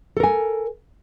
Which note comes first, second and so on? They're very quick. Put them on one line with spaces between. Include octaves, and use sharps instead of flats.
A4 A#4 G#5